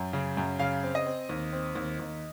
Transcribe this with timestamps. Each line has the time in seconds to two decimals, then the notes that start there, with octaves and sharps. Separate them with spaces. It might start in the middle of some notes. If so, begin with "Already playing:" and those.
Already playing: F#2
0.13 C#3
0.37 F#2
0.59 C#3 F5
0.83 C4
0.95 D#5
1.06 C4
1.29 D#2
1.53 C4
1.75 D#2
1.99 D#2